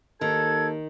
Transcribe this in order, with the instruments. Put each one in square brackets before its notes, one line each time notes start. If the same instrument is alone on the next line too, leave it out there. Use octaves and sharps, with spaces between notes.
[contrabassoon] D#2 [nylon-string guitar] D#3 [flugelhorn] A4 [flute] G#6